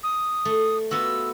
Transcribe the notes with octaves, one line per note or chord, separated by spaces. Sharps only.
D#6
A3
B3 F4 F#4 E6